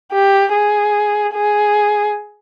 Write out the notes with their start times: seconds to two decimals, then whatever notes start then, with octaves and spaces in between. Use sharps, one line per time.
0.12 G4
0.53 G#4
1.33 G#4